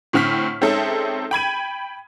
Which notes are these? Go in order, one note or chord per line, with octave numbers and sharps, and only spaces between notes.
A2 D3 C4 F6 B6
G#3 C4 C#4 D#4 A4 E5
G5 B5 G#6 D#7